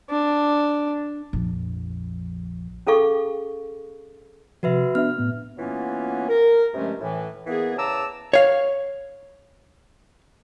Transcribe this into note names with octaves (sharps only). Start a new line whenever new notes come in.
D4
A#1 F2
C#4 G#4 A4 F5 C#6
C3 F3 F#4 B4 E5
B3 D4 E5 F6
A2 B3
E3 F#3 A#3 B3 C#4 F4
A#4
G2 C3 F3 G#3 A3 C#4
A2 E3
E3 A#3 B3 G#4
E2 C#3 A5 A#5 D6 E6
C#5 F5